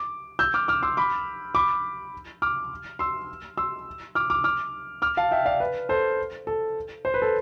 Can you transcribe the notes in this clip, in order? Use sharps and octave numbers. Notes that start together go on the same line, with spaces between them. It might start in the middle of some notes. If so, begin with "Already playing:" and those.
Already playing: D6
E6 G6
D6 F6
D6 F6
C6 E6
B5 D6
B5 D6
D6 F6
C6 E6
C6 E6
D6 F6
D6 F6
D6 F6
D6 F6
F5 A5
E5 G5
D5 F5
B4
A4 C5
A4
C5
B4
A4